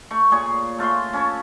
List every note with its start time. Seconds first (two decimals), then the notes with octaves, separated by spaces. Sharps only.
0.11 A3 C#6
0.31 A#2 G#4 C#5 C#6
0.78 A3 F4 E5 C6
1.13 C#4 A4 C#5